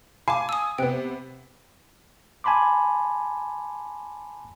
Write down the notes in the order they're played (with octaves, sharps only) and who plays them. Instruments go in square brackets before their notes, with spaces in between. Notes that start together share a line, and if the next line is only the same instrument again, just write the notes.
[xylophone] F5 A5 D6 [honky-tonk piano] G#5
[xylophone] D#6 E6
[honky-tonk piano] C3 B3 [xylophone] G5 F#6
[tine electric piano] G#5 A5 B5 C6 D6